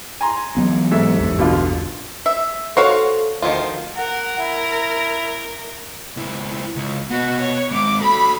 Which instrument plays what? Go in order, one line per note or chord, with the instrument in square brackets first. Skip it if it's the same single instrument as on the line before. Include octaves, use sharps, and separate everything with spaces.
[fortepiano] G#5 A#5 C6
[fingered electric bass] E3 F#3 B3
[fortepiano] G#2 A4 E5
[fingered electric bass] A1 E2 G2
[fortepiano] B2 D3 F4
[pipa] E5
[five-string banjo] F#4 [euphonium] A4 [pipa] C5 C#5 F5
[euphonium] D2 [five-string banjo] D#3 F3 F4
[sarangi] A#4 [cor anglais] F#5
[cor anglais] E4
[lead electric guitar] C#2 E4
C#2
[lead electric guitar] B3 D#5 [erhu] F#4
[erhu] C#5
[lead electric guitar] G#3 C4 [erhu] D6
[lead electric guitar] F#4 A4 [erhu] B5